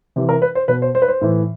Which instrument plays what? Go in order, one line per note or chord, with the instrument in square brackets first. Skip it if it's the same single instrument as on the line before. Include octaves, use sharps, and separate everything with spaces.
[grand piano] C3 E3 G4
A#4
B4
C5
B2 B4
C5
C5
B4
C5
A2 E3